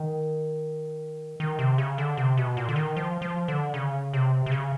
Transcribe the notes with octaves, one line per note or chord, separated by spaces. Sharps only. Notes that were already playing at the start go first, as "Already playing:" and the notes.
Already playing: D#3
D#3
C3
C#3
D3
C3
B2
A#2
D3
D#3
F3
F3
D3
C#3
C3
C3
C#3